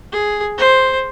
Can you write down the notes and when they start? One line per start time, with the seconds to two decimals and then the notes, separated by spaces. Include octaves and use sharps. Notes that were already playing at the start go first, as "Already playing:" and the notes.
0.12 G#4
0.58 C5